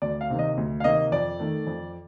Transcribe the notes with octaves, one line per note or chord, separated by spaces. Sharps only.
D2 D5
F5
C3 D#3 A#3
D#5
D2
F5
C3 D#3 A#3 D#5
F2 D5
D#3 A3
F2